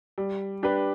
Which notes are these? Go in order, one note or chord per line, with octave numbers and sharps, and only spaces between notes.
G3
D4 G4 B4